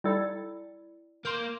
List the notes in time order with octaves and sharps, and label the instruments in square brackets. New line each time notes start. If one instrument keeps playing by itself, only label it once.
[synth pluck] G3 A4 [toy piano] E4 D5 B5
[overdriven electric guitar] A#3 [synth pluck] C6 G6